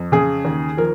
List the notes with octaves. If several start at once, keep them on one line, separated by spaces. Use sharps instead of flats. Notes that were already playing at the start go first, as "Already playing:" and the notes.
Already playing: F2
C#3 G#4
D#2
F3 A#4